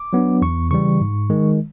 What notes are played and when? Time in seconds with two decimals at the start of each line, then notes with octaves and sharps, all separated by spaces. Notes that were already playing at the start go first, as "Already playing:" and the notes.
Already playing: D6
0.13 F#3 B3 D4
0.42 E2 C#6
0.71 C#3 E3 G3 C#6
1.01 G#2
1.30 D#3 G#3